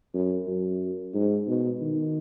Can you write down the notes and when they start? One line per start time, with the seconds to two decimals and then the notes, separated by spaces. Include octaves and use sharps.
0.14 F#2
0.47 F#2
1.14 G#2
1.47 B2
1.81 D#3